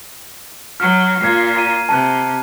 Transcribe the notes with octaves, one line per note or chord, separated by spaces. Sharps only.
F#3 F6
A#2 F4 G#6 C7
A#5 D#7
C3 A5 F#6